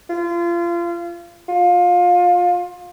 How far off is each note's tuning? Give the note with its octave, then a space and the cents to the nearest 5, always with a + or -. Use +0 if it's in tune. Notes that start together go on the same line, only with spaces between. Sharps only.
F4 -30
F4 +25